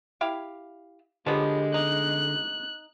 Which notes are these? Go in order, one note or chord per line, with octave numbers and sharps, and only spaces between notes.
E4 G4 F5
D3 F3 F#3 G#3 B3 G4
D#4 F#6